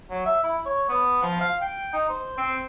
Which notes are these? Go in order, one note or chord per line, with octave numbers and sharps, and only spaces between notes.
F#3
E5
E4
C#5
B3
F3
F5
G5
D#4
C5
C4